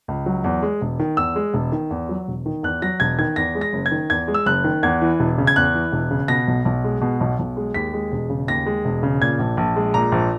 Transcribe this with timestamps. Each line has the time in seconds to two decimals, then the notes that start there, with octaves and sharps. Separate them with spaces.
0.08 C#2
0.26 F#3
0.44 E2
0.62 G#3
0.81 E1
0.99 D#3
1.17 E2 E6
1.36 G#3
1.54 E1
1.72 D#3
1.91 E2
2.09 F#3
2.28 E1
2.46 D#3
2.63 E2 F#6
2.82 F#3 A#6
3.00 E1 G#6
3.19 D#3 G#6
3.36 E2 A#6
3.55 G#3
3.61 A#6
3.73 F#1
3.86 G#6
3.91 D#3
4.10 E2 G#6
4.28 G#3
4.34 E6
4.46 F#1 F#6
4.64 D#3
4.83 E2 G#6
5.02 E3
5.19 E1
5.38 C#3
5.47 G#6
5.56 E2 F#6
5.75 E3
5.92 E1
6.11 C#3
6.28 B2 A#6
6.48 B1
6.65 B1
6.84 G#3
7.01 B2
7.21 B1
7.39 B1
7.57 G#3
7.74 D#2 B6
7.93 G#3
8.12 E1
8.30 C#3
8.48 D#2 A#6
8.66 G#3
8.85 E1
9.03 C#3
9.21 A#2 G#6
9.39 A#1
9.57 A#1
9.76 G#3
9.94 A#2 A#5
10.12 A#1